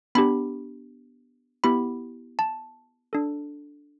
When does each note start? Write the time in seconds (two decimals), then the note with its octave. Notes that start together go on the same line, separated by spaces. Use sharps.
0.15 B3 D4 G4 B5
1.64 B3 E4 G4 B5
2.39 A5
3.13 D4 A4